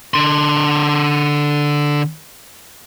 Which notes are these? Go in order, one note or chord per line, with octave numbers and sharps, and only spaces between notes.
D3 C6